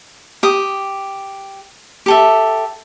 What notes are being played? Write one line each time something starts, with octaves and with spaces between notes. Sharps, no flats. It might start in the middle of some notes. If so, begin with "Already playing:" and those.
G4 D#6
G4 A4 E5